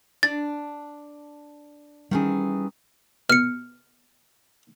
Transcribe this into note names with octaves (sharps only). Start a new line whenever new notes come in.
D4 A6
D#3 E3 G3 A3 C#4 G#4
B2 F6 C#7